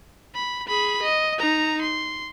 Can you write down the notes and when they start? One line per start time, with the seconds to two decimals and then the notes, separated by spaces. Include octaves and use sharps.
0.35 B5
0.68 G#4 B5
1.03 D#5
1.39 D#4 A#5
1.82 C6